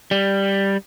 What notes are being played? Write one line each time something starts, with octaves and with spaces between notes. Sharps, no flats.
G3